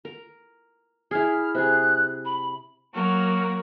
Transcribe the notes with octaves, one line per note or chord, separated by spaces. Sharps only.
A#4
E4 G#4 F6
C3 G#4 F#6
B5
F#3 A#3 F#4 A#4